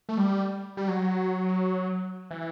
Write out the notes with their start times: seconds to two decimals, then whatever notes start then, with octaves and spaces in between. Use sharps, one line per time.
0.09 A3
0.17 G3
0.77 G3
0.88 F#3
2.31 E3